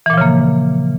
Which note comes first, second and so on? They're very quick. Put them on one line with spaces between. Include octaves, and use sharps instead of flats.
E3 A#2 F3 C#3 A#3